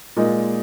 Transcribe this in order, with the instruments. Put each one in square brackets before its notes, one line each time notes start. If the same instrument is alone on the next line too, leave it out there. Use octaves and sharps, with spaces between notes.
[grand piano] A#2 G#3 D#4